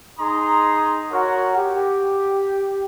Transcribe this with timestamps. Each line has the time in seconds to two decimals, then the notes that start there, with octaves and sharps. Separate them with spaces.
0.20 D#4 G#4 A#5 C6 D#6
1.11 F#4 A#4 C#5 F#5
1.56 G4